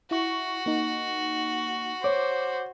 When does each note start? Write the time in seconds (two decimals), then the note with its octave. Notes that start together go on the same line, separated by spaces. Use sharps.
0.11 E4 F#4 C#6
0.66 A#3 D#4
2.04 C5 C#5 D6